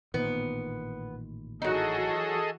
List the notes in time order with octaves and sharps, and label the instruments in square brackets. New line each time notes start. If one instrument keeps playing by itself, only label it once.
[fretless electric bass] A1 A#2 D#3 [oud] B3
[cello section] E3 F#4 [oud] F#3 D#4 [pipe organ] G#4 A4 D#5